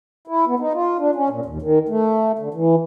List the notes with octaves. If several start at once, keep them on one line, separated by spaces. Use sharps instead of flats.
E4
B3
D#4
F4
D4
C#4
A#2
D#2
D#3
A3
D3
E3